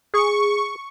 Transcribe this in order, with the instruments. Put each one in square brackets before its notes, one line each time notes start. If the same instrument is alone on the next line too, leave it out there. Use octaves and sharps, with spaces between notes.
[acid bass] G#4 [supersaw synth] C#6